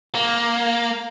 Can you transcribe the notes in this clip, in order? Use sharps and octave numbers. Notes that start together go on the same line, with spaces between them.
A#3